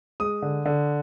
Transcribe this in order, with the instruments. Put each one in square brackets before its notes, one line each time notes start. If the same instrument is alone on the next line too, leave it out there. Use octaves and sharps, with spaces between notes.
[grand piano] G#3 D#6
D3
D3